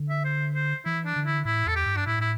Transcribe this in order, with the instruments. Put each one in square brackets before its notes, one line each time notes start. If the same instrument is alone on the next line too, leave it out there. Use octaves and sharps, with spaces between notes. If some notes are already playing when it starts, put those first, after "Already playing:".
Already playing: [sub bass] D3
[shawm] E5
C5
C5
[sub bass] E3 [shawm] E4
[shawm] D4
[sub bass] D3
[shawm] E4
[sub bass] A2 [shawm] E4
[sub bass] E2 [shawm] A4
[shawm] G4
[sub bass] G2
[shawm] D4
[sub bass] A2 [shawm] E4
[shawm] E4